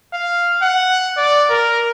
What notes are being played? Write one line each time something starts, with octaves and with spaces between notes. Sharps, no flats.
F5
F#5
D5
A#4